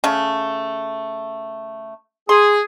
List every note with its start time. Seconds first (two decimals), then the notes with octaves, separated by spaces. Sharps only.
0.04 C#3 A3
2.29 G#4 C6